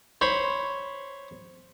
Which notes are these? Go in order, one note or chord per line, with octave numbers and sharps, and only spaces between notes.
C5 C#5 B5